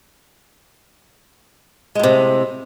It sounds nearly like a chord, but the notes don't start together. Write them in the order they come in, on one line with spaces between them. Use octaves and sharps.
G#3 A2 C3